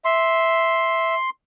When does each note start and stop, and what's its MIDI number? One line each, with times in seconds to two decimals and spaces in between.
0.05 1.15 76
0.05 1.30 84